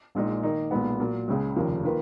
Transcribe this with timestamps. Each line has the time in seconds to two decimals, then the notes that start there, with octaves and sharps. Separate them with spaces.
0.15 A#1 A#2 G#3 D#4
0.43 D#3 A#3 D#4
0.71 B1 A#2 G#3 B3
0.99 A#2 F#3 A#3
1.28 C#2 C#3 G#3
1.56 F1 D#2 C#3 F3 A#3
1.83 D#3 A#3 F4 B4